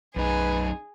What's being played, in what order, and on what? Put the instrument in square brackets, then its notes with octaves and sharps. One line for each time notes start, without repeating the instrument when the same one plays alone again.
[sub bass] B1 [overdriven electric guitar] F#2 D#4 [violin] G#4 [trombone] B4